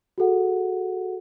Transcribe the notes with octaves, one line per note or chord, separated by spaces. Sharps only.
F#4 G#4 A4 F#5